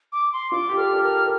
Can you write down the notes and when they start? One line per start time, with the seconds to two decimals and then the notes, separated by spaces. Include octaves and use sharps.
0.12 D6
0.33 C6
0.52 F4 D6
0.69 G4
0.77 A4 F6
0.93 A4
1.03 A#4 F6
1.24 A#4